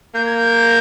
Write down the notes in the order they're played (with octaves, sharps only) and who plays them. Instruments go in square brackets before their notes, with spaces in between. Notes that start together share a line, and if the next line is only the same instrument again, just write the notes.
[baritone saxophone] A#3 [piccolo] G6
[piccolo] G#6
G6